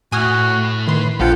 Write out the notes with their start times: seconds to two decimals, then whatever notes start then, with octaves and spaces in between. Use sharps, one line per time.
0.12 A2 E4 F#4 G#5 D#6 F6
0.88 D#3 B4 C6
1.20 A#1 F3 F4 A4 F#5 G5